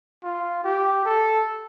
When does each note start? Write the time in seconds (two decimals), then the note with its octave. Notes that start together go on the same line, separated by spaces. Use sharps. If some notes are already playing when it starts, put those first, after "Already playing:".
0.23 F4
0.64 G4
1.05 A4